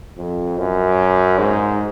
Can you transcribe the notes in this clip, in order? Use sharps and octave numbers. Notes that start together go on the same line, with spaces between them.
F2
F#2
G#2